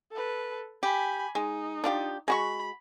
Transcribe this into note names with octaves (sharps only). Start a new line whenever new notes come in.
A4 B4
G4 G#5 B5
G#3 D#4
D4 F4 G4
G#3 F#4 B5 C#6